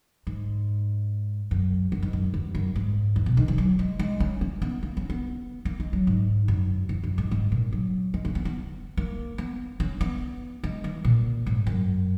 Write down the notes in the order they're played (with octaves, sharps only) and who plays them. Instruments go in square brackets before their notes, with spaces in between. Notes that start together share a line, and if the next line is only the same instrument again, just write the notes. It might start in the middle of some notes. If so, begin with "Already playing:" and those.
[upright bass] G#2
F#2
F#2
G#2
F#2
E2
F#2
G#2
E2
B2
D#3
E3
F#3
G#3
G#3
C#4
C#4
B3
A#3
C#4
B3
A#3
G#3
F#3
G#2
F#2
E2
F#2
G#2
G#2
A#2
F#3
G#3
A#3
B3
B3
A#3
B3
C#4
B3
G#3
E3
A#2
G#2
F#2